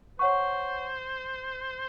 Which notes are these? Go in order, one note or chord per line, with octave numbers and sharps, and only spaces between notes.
C5 C#5 F#5 C#6